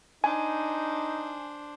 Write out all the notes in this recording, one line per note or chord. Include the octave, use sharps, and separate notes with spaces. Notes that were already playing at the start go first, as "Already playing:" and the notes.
D4 D#4 C5 G#5